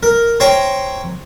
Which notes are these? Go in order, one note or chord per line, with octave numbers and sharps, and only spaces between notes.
A#4
C5 C#5 G5 A#5